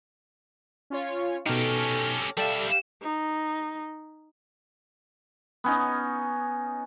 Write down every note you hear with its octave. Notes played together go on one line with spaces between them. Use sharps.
C#4 F4 C#5
B2 C#4 D#4 G4 A4 F6 A#6
G3 G4 A4 D5 E5 F5
D#4
B3 C#4 D#4